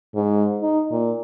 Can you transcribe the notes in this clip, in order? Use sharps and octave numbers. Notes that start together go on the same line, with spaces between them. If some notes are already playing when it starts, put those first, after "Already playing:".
G#2
D#4
A#2